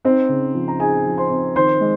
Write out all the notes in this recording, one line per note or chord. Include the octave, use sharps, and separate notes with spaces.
C4 D#4 C5
C#3
F3
A#5
D#4 G#4 G#5
F3
C5 C6
C4
D#3 C5 C6
G#3